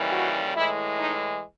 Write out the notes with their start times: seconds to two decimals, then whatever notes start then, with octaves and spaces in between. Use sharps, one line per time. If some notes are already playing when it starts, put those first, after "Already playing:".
Already playing: D#2 C#3 E3 G3
0.12 F#4
0.55 A2 E3 G#3 E4
0.99 D#4